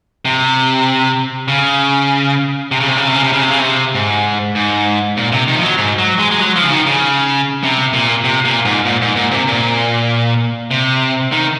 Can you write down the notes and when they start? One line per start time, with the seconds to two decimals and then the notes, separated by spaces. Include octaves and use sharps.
0.25 C3
1.48 C#3
2.71 C3
2.80 C#3
2.88 C3
2.97 C#3
3.07 C3
3.15 C#3
3.24 C3
3.33 C#3
3.41 C3
3.51 C#3
3.59 C3
3.94 G#2
4.55 G#2
5.17 A#2
5.32 C3
5.48 D#3
5.56 F3
5.63 F#3
5.78 G#2
5.98 F#3
6.19 G#3
6.31 G#3
6.40 F#3
6.56 F3
6.63 C#3
6.71 D#3
6.86 C#3
7.63 C3
7.93 A#2
8.24 C3
8.45 A#2
8.65 G#2
8.85 A#2
9.02 G#2
9.16 A#2
9.31 C3
9.47 A#2
10.71 C3
11.32 D#3